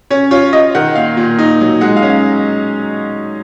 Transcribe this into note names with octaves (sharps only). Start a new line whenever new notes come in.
C#4 C#5
F4 C#5
F4 D#5
D#3 F#5
A#2 F5
A#2
D#4
F#3
G#3 F#5
F5
C#4
F5